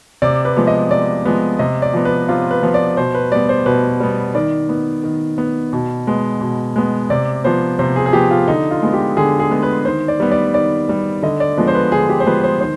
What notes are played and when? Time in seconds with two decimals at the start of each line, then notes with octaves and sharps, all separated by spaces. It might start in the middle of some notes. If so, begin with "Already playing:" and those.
0.22 C3 D5
0.45 B4
0.56 F3 G#3 B3
0.67 D#5
0.90 C3 D5
1.25 F3 G#3 B3
1.59 C3 D#5
1.82 D5
1.94 F3 B3
2.05 B4
2.28 C3 F4
2.51 B4
2.63 F3 B3
2.74 D5
2.97 B2 C5
3.15 B4
3.32 G3 B3 D5
3.49 C5
3.66 B2 B4
4.00 G3 B3
4.35 D#3 D5
4.69 B3
5.04 D#3
5.38 B3
5.73 B2
6.07 G#3 B3
6.41 B2
6.76 G#3 B3
7.10 C3 D5
7.44 F3 B3 C5
7.79 C3 C5
7.96 G#4
8.06 G#4
8.13 F3 B3 G4
8.31 F4
8.48 D3 D#4
8.71 F4
8.82 G#3 B3
8.94 G4
9.17 D3 G#4
9.40 G#4
9.51 G#3 B3
9.63 B4
9.85 D#3 C5
10.08 D5
10.20 G3 B3
10.31 D5
10.54 D#3 D5
10.89 G3 B3
11.23 D3 D#5
11.40 D5
11.57 F3 G#3 B3
11.68 C5
11.75 B4
11.92 D3 G#4
12.09 G4
12.20 C5
12.27 F3 G#3 B3 B4
12.44 C5
12.61 D#3 C5